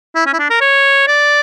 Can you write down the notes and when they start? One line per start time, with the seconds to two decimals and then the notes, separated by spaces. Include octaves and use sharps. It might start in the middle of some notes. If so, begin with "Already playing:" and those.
0.15 E4
0.26 C#4
0.33 E4
0.39 D4
0.50 A#4
0.61 C#5
1.07 D5